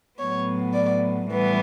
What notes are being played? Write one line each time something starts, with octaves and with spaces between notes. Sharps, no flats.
A2 F#3 B3 C#5
D5
A2 E3 G3 B3